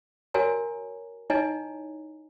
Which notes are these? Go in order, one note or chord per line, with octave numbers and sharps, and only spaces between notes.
F#4 A#4 C#5 G#5 A#5
D#4 E4 C#5 D#5 G#5 A#5